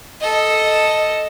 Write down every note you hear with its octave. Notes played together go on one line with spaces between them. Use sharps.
A4 D#5